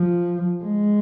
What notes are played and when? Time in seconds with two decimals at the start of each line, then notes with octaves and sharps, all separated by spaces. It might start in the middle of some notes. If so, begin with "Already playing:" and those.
Already playing: F3
0.64 G#3